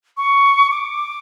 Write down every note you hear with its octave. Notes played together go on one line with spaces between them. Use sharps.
C#6
D6